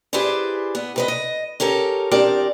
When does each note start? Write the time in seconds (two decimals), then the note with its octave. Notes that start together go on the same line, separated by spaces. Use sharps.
0.13 E4 G4 G#4 B4 C5 D5
0.75 B3
0.96 C3 B4 D#5
1.08 D#5
1.60 C#4 G4 A4 A#4
2.11 E2 C4 D4 G4 A#4 D5